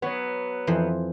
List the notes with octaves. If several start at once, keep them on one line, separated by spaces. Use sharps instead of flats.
F#3 B3 C#5
F2 E3 C5